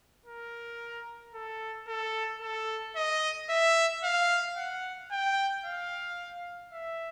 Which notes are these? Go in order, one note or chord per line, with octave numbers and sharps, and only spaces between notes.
A#4
A4
A4
A4
D#5
E5
F5
F#5
G5
F5
E5